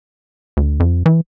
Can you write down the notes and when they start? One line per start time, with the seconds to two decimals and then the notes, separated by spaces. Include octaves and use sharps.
0.57 D2
0.80 F2
1.06 E3